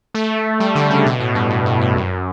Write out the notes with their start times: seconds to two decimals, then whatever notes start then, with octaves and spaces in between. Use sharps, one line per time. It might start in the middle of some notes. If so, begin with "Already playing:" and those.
0.14 A3
0.60 G3
0.75 D3
0.90 C#3
1.06 B2
1.20 A2
1.35 G2
1.50 A2
1.66 A2
1.81 G2
1.96 F#2